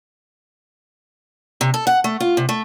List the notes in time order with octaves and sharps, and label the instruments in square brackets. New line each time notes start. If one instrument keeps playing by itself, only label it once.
[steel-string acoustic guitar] C3
A4
F#5
A3
F4
C3
A3